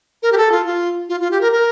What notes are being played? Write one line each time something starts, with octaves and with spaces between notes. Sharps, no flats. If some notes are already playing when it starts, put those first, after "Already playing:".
A#4
G4
A4
F4
F4
F4
F4
G4
A#4
A#4